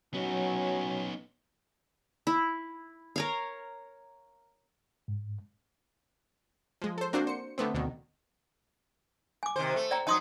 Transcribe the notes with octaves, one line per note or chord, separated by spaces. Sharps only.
F#3 B3 C#4 D#4
E4
A#4 C#5 F5
G#2
F3 G#3
A4 C5
A#3 C4 D4 F#4 C5
C5 C#7
D3 A3 B3 C4
D2 B2 D3 D#3
G#5 D6
C3 D#3 C5
A3
D5 G5 A#5
F#3 D#4 A5 C6 D#6